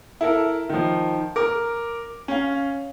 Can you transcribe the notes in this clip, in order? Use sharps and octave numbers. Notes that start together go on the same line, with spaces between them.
E4 A4 A#4
D#3 F3
A#4 D6
C#4 F5